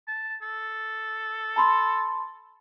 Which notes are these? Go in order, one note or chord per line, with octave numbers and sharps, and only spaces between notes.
A5
A4
A5 B5 C6